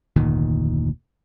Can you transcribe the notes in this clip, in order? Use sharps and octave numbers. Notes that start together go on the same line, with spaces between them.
F1 D2 A#2 D#3